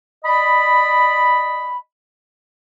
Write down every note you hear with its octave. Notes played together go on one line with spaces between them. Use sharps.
D5 D#5 B5